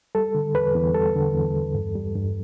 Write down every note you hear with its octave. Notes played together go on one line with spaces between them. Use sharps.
G3 A4
D3
E2 B4
E2
G3 A4
D3
E2
E2
G2
G3
G2